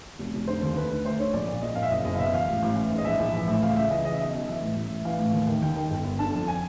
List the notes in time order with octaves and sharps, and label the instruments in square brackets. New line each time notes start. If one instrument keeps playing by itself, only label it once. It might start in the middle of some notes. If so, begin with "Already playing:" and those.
[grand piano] F1
F1
D3 C5
D#2
D2 B4
D3
D2 C5
D3 C#5
A#1 D5
A#2
A#1 D#5
A#2 F5
E5
F#1 D#5
F#1 D#5
F5
B2 E5
E2 F5
A1
A1
E3
G#2
D#5
A#1 E5
A#1
E3
A2
C#2 F5
C#2 E5
E3 D#5
C#3 D#5
E5
B1 D#5
B1
E3 E5
A2
A1
A1
E3 F5
A2
D#2
D#3
D#2 G5
D#3
G1
G1
D3 A5
F2
G#5